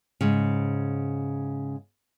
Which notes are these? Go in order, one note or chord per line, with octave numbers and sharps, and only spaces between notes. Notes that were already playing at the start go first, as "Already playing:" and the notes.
G#2 C#3